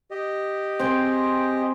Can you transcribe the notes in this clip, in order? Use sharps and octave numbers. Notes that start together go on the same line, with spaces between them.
G4 D#5
C4 G#4 G5